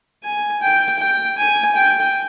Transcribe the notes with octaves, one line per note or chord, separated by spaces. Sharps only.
G#5
G5
G5
G#5
G5